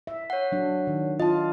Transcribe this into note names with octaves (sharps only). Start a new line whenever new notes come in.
E5
C#5 F#5
F#3 D4
D#3
F4 D#5 A5